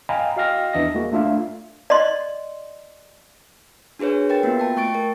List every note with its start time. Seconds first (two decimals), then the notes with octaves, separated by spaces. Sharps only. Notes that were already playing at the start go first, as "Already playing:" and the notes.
0.09 D#5 F5 G5 G#5 A#5 B5
0.37 F#4 D#5 F5 G5 F6 A#6
0.73 E2 E3 D4 D#5 E5 A#6
0.95 G#3 A#3 F#4
1.12 A3 D4 F4 E5 F5
1.90 D5 D#5 C6
3.99 D4 F#4 G#4 B4 C#5
4.29 A#4 B4 G5 A6
4.43 A#3 B3 F4 F#4
4.59 G5 A5
4.76 A3 G5 C#6 A6 D7
4.95 A#4